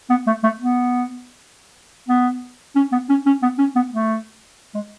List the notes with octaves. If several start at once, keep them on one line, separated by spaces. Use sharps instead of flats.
B3
A3
A3
B3
B3
C#4
B3
C#4
C#4
B3
C#4
B3
A3
G#3